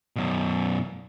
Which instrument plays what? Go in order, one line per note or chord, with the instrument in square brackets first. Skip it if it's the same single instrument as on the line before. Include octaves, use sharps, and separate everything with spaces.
[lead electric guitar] F#2 B2